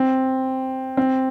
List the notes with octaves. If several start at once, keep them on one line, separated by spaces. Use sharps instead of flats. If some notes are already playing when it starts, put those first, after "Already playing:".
Already playing: C4
C4